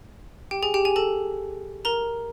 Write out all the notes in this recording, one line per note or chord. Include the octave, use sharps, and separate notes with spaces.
G4 G5
G#4 G#5
G4 G5
G#4 G#5
A4 A5
A#4 A#5